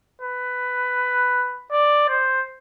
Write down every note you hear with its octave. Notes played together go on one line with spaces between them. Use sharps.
B4
D5
C5